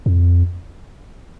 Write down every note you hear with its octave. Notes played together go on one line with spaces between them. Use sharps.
F2